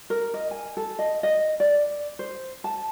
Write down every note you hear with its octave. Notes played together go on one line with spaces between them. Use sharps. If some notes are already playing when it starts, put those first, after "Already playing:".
A#4
D#5
G#5
A4
D#5
D#5
D5
C5
A5